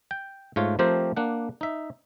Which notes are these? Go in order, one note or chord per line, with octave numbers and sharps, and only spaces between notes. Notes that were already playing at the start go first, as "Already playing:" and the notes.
G5
G#2 A3 F4 C#5
F3 A3 C4 G4 A#4 C5
A#3 D4 F#5
D#4 E5